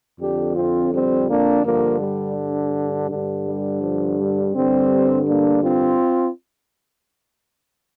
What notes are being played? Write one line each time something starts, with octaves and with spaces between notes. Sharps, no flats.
F2 D3 D4 G4
C4 F4
G3 C4
A#3 D4
G2 D3 F3 A#3
G3
G2 D3
G3
F3
G3
G2 D3 G3 C4
A#3 D4
C4 F4